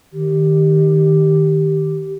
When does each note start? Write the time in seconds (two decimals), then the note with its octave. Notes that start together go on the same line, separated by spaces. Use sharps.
0.13 D#3 G4